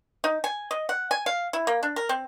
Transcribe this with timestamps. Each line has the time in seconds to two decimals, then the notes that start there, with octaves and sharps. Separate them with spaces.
0.24 D#4
0.44 G#5
0.71 D#5
0.89 F#5
1.11 G#5
1.26 F5
1.53 E4
1.67 A#3
1.83 D4
1.96 A#4
2.09 C4